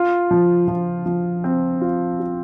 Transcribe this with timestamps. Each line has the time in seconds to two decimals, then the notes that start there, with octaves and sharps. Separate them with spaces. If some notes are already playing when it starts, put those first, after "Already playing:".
Already playing: F4
0.31 F3
0.68 F3
1.06 F3
1.44 C4
1.81 F4
2.19 F4